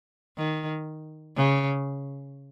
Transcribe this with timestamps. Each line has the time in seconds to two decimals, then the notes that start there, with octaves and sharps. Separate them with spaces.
0.37 D#3
1.36 C#3